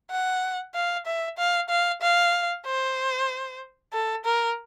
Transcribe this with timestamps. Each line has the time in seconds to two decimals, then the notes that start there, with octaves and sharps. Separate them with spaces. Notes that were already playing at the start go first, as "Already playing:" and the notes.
0.11 F#5
0.75 F5
1.06 E5
1.38 F5
1.70 F5
2.02 F5
2.66 C5
3.93 A4
4.25 A#4